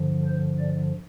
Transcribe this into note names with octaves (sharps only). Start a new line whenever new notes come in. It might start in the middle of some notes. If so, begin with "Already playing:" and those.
Already playing: G2 D3 F3
C5
D5